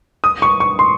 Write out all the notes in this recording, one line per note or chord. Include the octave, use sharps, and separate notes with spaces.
D#6
C#6
C#6
C6